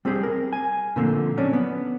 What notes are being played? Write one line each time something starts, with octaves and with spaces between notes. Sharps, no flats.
G3 C4 G4 G#4 C5
A#4
G#5
A#2 D3 F3 A3 A#3 C4
F#3 C#4 D4
B3